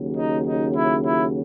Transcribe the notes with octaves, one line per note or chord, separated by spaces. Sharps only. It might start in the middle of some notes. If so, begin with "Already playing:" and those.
Already playing: D#2 C#3 F#3
D#4
D#4
E4
E4